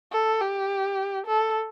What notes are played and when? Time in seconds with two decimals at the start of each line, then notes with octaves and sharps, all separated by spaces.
0.12 A4
0.41 G4
1.27 A4